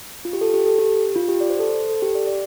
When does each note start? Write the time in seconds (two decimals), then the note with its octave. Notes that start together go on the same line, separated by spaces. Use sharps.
0.25 F4
0.33 G4
0.41 A4
0.54 G4
0.66 A4
0.79 G4
1.16 F4
1.28 G4
1.40 D5
1.50 C5
1.59 A4
1.69 C5
1.90 A4
2.02 G4
2.15 D5
2.27 D5